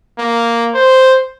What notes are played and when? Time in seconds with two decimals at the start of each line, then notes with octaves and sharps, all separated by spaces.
0.19 A#3
0.75 C5